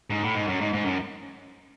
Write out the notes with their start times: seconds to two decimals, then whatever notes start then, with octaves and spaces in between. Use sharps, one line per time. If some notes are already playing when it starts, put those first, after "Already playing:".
0.10 G#2
0.23 A2
0.35 G#2
0.47 F#2
0.61 G#2
0.73 G#2
0.85 F#2